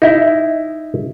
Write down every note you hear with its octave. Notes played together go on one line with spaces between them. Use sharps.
D#4 E4